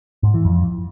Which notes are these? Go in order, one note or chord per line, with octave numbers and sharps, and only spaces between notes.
G#2
E3
F2